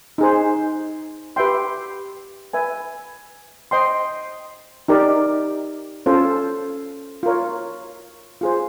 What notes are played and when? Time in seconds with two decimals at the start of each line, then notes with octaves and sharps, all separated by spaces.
0.18 D#4 G#4 C5
1.36 G4 B4 E5 G5 C6
2.53 B4 E5 G#5
3.71 C5 D#5 G5 C6
4.88 D#4 G4 A#4 D5
6.06 C#4 F4 A4 C5
7.23 F4 A#4 C#5
8.41 F4 G#4 C5